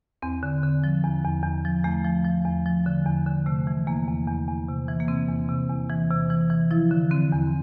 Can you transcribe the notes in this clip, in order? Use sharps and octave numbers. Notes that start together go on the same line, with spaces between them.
E2 C4
D3
D3
F3
E2
E2
E2
F3
E2 A3
F3
F3
E2
F3
D3
E2
D3
C3 A3
E3
E2 A#3
E2
E2
E2
C3
E3
A#3
C3 C4
E2
C3
E2
E3
C3
E3
E3
F3 E4
D3
D3 C4
E2